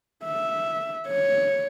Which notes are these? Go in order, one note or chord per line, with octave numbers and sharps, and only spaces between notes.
E5
C#5